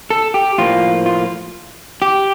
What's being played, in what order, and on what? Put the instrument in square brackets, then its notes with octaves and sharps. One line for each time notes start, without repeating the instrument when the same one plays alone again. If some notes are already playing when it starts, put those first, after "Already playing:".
[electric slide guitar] A4
G4
A2 F3 A#3 F4
F4
G4